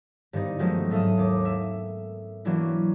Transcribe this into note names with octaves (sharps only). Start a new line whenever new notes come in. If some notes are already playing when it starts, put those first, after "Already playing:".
G2 D#3 G3 B3 C4 D#4
D#3 F3 F#3 G#3 A3 D#4
G#2 A4 E5 F5 D#6
D#2 D6
E5
E3 F#3 A#3 C#4 D4 E4